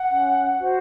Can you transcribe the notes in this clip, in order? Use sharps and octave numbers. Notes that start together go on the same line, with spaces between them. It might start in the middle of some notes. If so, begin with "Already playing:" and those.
Already playing: F#5
C#4
F#4 C5